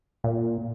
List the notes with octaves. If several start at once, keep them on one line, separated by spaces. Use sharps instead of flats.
A#2